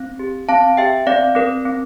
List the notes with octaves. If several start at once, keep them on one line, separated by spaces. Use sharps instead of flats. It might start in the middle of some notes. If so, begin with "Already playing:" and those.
Already playing: C4
G4
C4 F5 A5
G4 E5 G5
C4 D5 F5
C4 A#4
C4